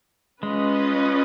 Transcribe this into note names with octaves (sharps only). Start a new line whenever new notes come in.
G#3 C#4 F4 B4 D#5